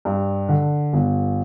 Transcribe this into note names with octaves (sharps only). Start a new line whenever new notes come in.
G2
D3
G1